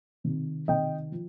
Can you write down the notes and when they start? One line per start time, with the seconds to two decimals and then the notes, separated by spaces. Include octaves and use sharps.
0.24 C3 D#3
0.68 C3 D#3 D#5 G5
1.12 F3